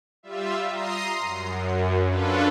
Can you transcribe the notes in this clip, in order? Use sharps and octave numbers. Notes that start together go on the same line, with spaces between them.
G3 F4 E5
A#5 C6 D#6 C7
F#2
C#4 D4 F4 A4 B4